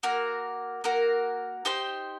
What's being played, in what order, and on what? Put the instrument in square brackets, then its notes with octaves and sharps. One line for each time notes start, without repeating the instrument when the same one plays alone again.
[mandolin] A#3 F#4 A#4
A#3 F#4 A#4
D#4 G4 C5 G5